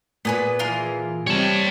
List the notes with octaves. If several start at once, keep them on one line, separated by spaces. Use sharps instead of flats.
A#2 B3 G#4 B4
E3 F4 G#4 A#4
C3 G3 C#5 A5